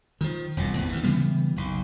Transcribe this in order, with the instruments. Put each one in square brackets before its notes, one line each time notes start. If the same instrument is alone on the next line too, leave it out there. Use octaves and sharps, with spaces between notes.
[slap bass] D#3 F3
E1 C2 A#2
G#1 E2 G2
D2 E3
C#3 E3 G3 B3
F#1 B1